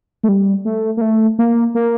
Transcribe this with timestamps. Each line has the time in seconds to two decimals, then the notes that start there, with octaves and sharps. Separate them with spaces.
0.23 A3
0.28 G3
0.65 A3
0.97 A#3
1.01 A3
1.39 A#3
1.75 A#3